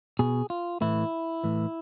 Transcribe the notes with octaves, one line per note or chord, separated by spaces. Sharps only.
B2 G#4
F4
A2 E3 E4
A2 E3